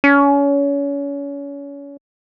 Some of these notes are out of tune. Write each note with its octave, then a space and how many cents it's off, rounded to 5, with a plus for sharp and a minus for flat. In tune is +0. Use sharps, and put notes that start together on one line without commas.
C#4 +30